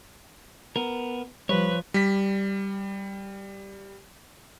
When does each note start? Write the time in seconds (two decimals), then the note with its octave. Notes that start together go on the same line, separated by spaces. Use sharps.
0.76 B3 A#4
1.49 F3 G3 B4 C#5
1.94 G3 B6